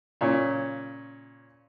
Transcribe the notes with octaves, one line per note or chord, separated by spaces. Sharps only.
A#2 C#3 C#4